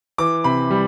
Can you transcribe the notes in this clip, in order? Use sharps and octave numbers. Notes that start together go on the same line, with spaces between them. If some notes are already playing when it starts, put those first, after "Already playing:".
E3 D6
C3 B5
G3